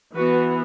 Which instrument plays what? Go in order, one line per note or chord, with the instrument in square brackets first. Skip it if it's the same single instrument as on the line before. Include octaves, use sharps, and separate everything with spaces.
[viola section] E3 B3 F#4 B4